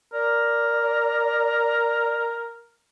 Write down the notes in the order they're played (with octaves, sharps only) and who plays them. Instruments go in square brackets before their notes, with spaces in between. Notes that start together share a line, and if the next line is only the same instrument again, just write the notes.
[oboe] A#4 [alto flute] D5